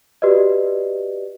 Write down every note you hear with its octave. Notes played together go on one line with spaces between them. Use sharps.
F#4 G4 B4 D5 D#5